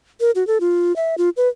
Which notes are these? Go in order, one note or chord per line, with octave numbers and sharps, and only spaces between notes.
A#4
F#4
A4
F4
E5
F4
B4